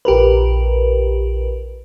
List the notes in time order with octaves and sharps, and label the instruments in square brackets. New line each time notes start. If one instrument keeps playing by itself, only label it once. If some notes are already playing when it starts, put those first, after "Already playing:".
[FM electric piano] A#1 G4 A#4 B4